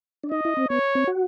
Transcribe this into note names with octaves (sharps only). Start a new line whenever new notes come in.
D4
D#4 D#5
E4
C4
B3 C#5
C4
F#4